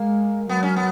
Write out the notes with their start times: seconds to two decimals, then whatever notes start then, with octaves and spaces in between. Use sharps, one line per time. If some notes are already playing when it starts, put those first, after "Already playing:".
Already playing: G#3 A#3
0.49 F#3 B3
0.63 C#4
0.76 B3